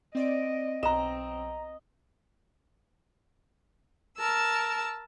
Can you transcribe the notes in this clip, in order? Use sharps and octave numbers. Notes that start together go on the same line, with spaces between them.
C4 D5 D#5 D7
B1 C4 D#5 A#5 E7
A#4 A5 E6